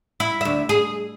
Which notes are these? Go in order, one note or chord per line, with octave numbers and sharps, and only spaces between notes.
E4
D2 E5
G#4